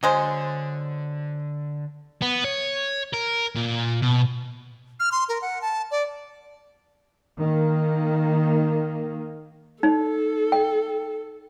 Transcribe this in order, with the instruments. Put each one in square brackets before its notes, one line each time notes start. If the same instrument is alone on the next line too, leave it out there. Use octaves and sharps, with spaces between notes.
[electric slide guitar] D3 [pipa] F#3 G#3 C5
[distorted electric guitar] B3
C#5
A#4
A#2
B2
[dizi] F6
C6
A#4
F#5
A5
D5
[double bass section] D#3 A#3
[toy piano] D#4 [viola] A4
[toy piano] G5